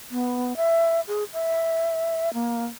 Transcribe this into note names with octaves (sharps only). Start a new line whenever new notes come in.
B3
E5
G#4
E5
A#3